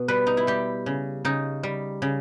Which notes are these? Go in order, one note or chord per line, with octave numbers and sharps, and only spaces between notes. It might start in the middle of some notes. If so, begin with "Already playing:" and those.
Already playing: B2
G3 B4
D#4
E4
G3 G4
C#3
C#3 D#4
G3
C#3